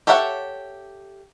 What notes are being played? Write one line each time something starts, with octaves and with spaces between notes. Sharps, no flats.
G4 A4 C#5 E5 F#5